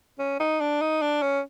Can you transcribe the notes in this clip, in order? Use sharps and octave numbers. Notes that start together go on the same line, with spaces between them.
C#4
D#4
D4
D#4
D4
C#4